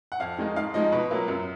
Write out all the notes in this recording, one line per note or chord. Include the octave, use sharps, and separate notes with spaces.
F#5
F2 F5
D#3 G#3 D#4
G#2 F5
F3 G#3 D#4 D#5
B2 B4
F#3 A#3 F4
F#2